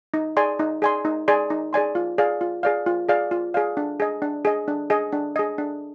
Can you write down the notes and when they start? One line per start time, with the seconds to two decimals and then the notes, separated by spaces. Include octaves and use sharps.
0.14 D#4
0.37 G#4 D5 G#5 C6
0.59 D#4
0.82 G#4 D5 G#5 C6
1.05 D#4
1.28 G#4 D5 G#5 C6
1.50 D#4
1.73 G#4 D5 G#5 C6
1.95 F4
2.18 G#4 D5 F5
2.41 F4
2.63 G#4 D5 F5
2.86 F4
3.09 G#4 D5 F5
3.31 F4
3.54 G#4 D5 F5
3.77 D4
4.00 G#4 D#5
4.22 D4
4.45 G#4 D#5
4.68 D4
4.90 G#4 D#5
5.12 D4
5.36 G#4 D#5
5.58 D4